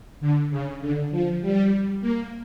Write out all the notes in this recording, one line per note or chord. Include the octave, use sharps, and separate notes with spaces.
D3
C#3
D3
F3
G3
A#3